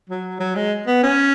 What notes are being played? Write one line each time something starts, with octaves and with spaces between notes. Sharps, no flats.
F#3
F#3
G#3
B3
C#4